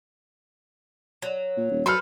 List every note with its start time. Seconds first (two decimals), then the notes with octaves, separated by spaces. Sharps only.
1.22 F#3
1.57 A#2
1.71 D#1
1.86 F#3 A4 B4 C5 C6 F6